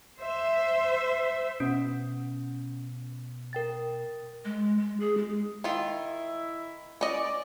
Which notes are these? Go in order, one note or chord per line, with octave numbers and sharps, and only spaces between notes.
C5 E5
B2 C#4
A#4 G5 A6
G#3
G#3
G#4
G#3
D#3 E4 F4
C#4 D5 D#5